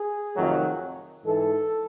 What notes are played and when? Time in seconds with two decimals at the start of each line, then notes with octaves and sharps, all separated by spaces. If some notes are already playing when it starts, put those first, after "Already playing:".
Already playing: G#4
0.35 F2 C3 D#3 F#3 A3
1.25 G#2 E3 G#3 A4